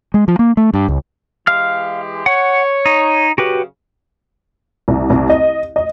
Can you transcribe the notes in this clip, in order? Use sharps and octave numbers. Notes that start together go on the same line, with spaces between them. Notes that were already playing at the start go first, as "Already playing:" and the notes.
G#3
F3
A#3
A3
G2
C#2
E3 G#3 G4 F5 F6
C#5 F#5
D#4
F#2 C#3 F#4 G4 B4
C2
C2
D#5
D#5